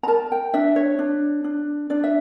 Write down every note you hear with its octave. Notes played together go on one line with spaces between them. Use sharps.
A#5
A#4 A5
G5
D4 E5
C#5
D4
D4
D4 D5
E5